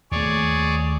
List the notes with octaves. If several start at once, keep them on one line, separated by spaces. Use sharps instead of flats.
D#2 A3 G#4 C#5 D5